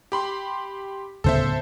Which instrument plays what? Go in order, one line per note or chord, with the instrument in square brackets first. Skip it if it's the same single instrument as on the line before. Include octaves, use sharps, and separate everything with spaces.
[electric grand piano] G4 B5 C6
[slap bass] D1 C#3 B3 [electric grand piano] A4 C5 E5